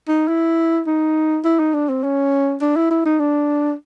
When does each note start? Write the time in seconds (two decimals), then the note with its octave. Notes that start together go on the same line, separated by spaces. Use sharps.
0.08 D#4
0.28 E4
0.87 D#4
1.45 E4
1.59 D#4
1.74 D4
1.89 C4
2.03 C#4
2.61 D4
2.76 E4
2.91 E4
3.05 D#4
3.20 D4